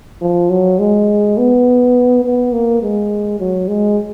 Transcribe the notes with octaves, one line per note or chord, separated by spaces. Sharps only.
F3
F#3
G#3
B3
B3
A#3
G#3
F#3
G#3